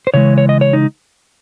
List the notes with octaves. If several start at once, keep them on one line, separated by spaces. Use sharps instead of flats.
C5
C#3 E3 G#3 C#5
C#5
D#5
C#5
D#4